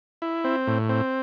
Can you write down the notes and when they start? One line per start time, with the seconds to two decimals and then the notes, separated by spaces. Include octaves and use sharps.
0.22 E4
0.44 C4
0.67 A2
0.89 C4